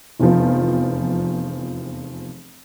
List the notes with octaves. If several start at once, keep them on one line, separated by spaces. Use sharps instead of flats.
F1 E2 F3